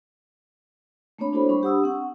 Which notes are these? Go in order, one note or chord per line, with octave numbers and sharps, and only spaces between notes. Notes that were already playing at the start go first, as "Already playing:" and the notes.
A3 A#3 C4 D4 C#5 B5
D4 E4 F#4 A4 C5 B5
G3 D4 C5 B5 C#6
D4 G4 F#5 D#6 E6
C4 F#5 C#6